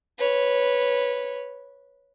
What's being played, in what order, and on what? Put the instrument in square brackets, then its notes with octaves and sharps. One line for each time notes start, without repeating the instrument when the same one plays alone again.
[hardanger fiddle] B4 C#5